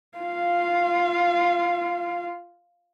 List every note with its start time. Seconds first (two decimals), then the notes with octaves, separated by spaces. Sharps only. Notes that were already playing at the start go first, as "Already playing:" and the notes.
0.18 F4 F5